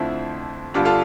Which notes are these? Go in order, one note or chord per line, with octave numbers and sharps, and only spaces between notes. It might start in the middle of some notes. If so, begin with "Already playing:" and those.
Already playing: F2 D3 F3 A3 C4 E4
G1 G2 D3 G3 D4 F4
F4 A4